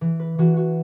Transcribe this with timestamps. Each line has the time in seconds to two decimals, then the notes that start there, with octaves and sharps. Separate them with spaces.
0.01 E3
0.20 B4
0.39 E3 F#4
0.57 F#4